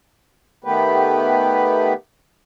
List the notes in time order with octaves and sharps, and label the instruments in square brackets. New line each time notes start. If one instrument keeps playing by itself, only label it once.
[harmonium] D#3 A3 B3 G4 B4